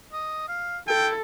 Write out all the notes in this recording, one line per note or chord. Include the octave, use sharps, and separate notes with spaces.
D#5
F5
E4 A4 G5